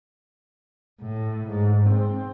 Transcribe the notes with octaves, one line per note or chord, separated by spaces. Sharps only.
A2
G#2
C4